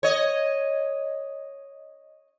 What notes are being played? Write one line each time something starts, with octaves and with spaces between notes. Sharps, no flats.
C#5 D#5